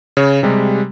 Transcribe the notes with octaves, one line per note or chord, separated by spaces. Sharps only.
C#3 C#5
C3 G3 G#3